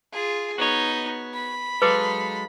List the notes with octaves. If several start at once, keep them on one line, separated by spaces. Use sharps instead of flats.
F4 G#4
B3 D#4 F#4 C#5
B5
F#3 G#3 D#4 A4 B4 F5 D6